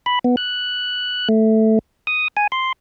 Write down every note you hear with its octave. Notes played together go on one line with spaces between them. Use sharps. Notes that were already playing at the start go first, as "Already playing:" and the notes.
B5
B3
F#6
A3
D#6
G#5
C6